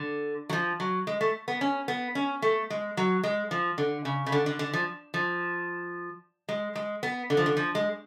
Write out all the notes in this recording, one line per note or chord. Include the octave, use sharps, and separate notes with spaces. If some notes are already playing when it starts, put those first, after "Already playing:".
Already playing: D3
F#3
F3
F#3
G#3
A3
B3
C#4
B3
C#4
A3
G#3
F#3
G#3
F3
D3
C#3
C#3
D3
D3
D3
F3
F3
G#3
G#3
B3
D3
F3
D3
F3
G#3